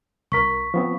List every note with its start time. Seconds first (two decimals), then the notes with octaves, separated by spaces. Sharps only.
0.32 C2 A#4 C#6 B6
0.74 F3 B3 C4